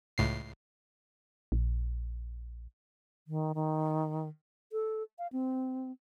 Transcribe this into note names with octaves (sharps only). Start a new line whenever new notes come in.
C#2 A2 C7
A#1
D#3
D#3
A4
F5
C4